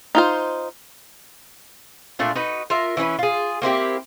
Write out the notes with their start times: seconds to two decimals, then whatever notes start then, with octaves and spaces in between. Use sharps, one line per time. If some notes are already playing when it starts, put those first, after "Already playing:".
0.15 D#4 F4 C5
2.19 A#2 A3 D4 F4
2.35 D#4 F#4 B4
2.70 F4 A#4 E5
2.97 E3 C#4 D#4 B4
3.19 F4 G#4
3.62 A#3 C4 E4 G4